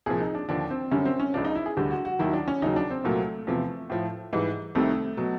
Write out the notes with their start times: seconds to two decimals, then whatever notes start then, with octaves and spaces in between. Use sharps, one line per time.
0.06 C2 A#2 F3 G#4
0.20 D#4
0.35 D4
0.49 D#2 D3 F3 D4
0.70 C4
0.91 F#2 D3 G3 C#4
1.05 C4
1.20 C#4
1.34 C#2 C#3 F3 D4
1.45 D#4
1.55 E4
1.66 G#4
1.77 D2 D3 G3 G4
1.91 F#4
2.05 F#4
2.19 D#2 D#3 F#3 E4
2.33 D4
2.48 C#4
2.62 D#2 C#3 F#3 D#4
2.76 D4
2.91 C4
3.04 C2 A#2 F#3 A3
3.47 E2 C3 F3
3.90 A2 F3
4.33 G#2 E3 G3
4.75 C2 C3 D#3 G3 A3
5.17 B2 F#3